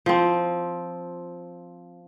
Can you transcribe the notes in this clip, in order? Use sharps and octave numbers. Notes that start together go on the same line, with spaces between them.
F3 C4